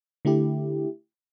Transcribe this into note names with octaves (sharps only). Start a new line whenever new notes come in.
D3 A3 E4 G4